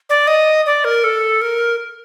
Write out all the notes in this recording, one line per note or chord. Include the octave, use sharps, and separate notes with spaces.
D5
D#5
D5
A#4
A4
A#4